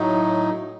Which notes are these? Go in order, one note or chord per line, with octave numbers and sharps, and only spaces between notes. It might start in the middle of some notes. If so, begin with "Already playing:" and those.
Already playing: A2 F#3 A3 D#4